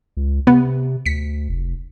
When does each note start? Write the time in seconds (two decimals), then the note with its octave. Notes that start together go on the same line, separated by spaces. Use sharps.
0.17 C#2
0.47 C3 B3
1.06 D2 B6 C#7
1.49 F1